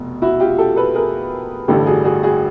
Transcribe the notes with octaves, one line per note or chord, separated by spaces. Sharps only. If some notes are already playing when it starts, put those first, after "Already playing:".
Already playing: F1 B2
E4 F#4
F4 G4
G4 A4
A4 B4
G#4 A#4
A1 G2 D3 G3 G4 A4
F#4 G#4
F#4 G#4
F#4 G#4